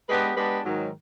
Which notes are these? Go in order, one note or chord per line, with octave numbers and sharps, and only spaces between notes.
G#3 B3 D4 G4 B4
G#3 B3 D4 G4 B4
G#2 D#3 F#3